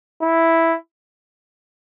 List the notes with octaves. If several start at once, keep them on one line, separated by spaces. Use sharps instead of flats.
E4